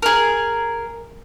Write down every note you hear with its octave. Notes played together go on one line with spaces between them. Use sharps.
G#4 A#4